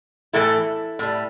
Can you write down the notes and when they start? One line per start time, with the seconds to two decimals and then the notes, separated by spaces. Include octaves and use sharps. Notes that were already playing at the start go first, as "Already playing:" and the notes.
0.33 A2 E3 A3 E4 A4
0.99 A2 G3